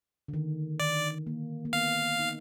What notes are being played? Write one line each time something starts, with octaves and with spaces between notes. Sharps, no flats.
D3
D#3
D#3 D5
A#3
A#3
B3 F5
D#4